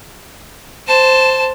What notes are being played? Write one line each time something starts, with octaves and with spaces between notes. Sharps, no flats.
C5 A5